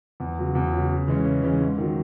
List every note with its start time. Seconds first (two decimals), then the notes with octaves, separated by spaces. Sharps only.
0.20 E2
0.38 C#3 F#3
0.55 E2
0.72 C#3 F#3
0.90 C#3
1.08 E3 G#3 C#4
1.25 C#3
1.42 E3 G#3 C#4
1.61 G#2
1.78 D#3 F#3